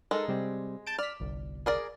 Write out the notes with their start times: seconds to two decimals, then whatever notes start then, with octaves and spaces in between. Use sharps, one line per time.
0.11 G#3 D#4 A4 A#4
0.28 C3 G3 C4
0.87 A5 G6 D7
0.99 D5 F6 B6
1.20 G1 C2
1.66 G#4 A#4 D5